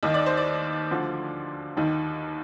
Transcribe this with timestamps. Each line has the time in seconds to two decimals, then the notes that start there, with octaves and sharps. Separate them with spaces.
0.03 D#2 D#3 D#5
0.14 D5
0.26 C5
0.37 D5
0.91 D2 D3 F3
1.77 D#2 D#3 D#4